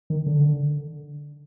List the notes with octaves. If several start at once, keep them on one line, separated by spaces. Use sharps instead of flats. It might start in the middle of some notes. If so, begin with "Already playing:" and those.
D#3
D3